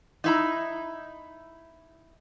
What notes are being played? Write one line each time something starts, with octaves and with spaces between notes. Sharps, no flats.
D#4 E4 A#5